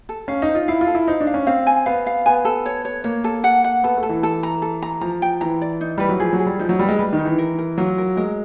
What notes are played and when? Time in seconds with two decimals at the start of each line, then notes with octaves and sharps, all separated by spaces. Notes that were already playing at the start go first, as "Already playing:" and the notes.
0.09 A4
0.28 C#4 F5
0.42 D#4
0.48 C5
0.55 F4
0.68 E4 F5
0.81 F4
0.87 A4
0.95 E4
1.08 D#4 C5
1.20 D4
1.27 F5
1.34 C#4
1.47 C4 F5
1.67 G#5
1.86 B3 F5
2.07 F5
2.26 B3 G#5
2.45 A4
2.66 C#5
2.85 C#5
3.04 A#3 C#5
3.24 A4
3.44 F#5
3.64 F#5
3.84 B3 A4
3.97 A3
4.03 A4
4.09 E3
4.23 A4
4.43 A#5
4.62 A4
4.82 A#5
5.01 F3 A#5
5.22 G5
5.41 E3 A#5
5.62 D5
5.81 D#4
5.98 G3 B4
6.09 F#3
6.20 F3 G#4
6.33 F#3
6.39 G#4
6.46 G3
6.59 F3 D#4
6.69 F#3
6.79 G3 B4
6.89 G#3
6.99 G3 B4
7.13 D#3
7.19 D#4
7.25 E3
7.38 A#4
7.58 A#4
7.78 F#3 F4
7.98 A#4
8.17 G#3 A#4